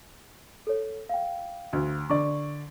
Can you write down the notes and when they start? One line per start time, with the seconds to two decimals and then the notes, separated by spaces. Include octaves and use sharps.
0.67 A4 C#5
1.09 F5 G5
1.73 D2
2.10 D3 D5 C#6